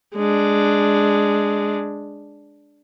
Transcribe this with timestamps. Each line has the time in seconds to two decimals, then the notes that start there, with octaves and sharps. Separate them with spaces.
0.15 G#3 D4